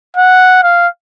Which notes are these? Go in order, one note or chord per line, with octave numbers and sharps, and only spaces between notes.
F#5
F5